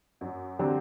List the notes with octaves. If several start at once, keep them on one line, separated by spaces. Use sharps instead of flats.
F#2
D3 F#3 C4 G4